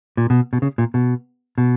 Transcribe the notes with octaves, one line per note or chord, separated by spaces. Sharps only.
A#2
B2
B2
C#3
A#2
B2
B2